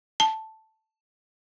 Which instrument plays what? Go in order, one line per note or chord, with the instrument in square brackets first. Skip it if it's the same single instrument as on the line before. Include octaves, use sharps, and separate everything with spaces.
[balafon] A5